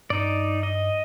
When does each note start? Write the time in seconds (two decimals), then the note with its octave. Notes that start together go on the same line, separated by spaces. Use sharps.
0.10 G2 D#4 D5
0.63 D#5